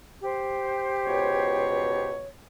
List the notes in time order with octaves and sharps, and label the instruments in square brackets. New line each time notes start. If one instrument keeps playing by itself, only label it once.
[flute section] G4 C5
[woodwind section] C#2 B2 C#5